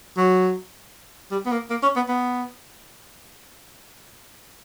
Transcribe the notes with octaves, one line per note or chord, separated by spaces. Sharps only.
F#3
G3
B3
A#3
A#3
C#4
B3
B3